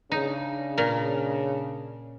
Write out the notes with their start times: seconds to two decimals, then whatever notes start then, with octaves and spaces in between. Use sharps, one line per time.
0.12 C#3 D4 D#4
0.78 A#2 A#4